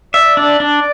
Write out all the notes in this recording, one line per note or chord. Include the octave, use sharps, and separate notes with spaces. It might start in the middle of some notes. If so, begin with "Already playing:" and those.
D5 E5
D4
D4